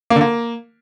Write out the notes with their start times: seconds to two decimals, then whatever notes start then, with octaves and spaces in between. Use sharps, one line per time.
0.10 A#3
0.16 D3
0.21 A#3